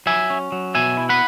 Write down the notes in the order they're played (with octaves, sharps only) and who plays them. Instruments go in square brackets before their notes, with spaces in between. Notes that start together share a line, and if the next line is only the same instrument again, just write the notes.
[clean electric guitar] F#3 E5 G#5
C#4
F#3
B2 E5 G#5
E4
F#5 B5